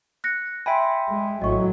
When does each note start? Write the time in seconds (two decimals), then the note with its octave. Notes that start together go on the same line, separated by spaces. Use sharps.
0.24 F#6 A#6 C#7
0.66 E5 G5 G#5 B5 C6
1.09 G#3
1.42 A1 F#3 D#5 C#6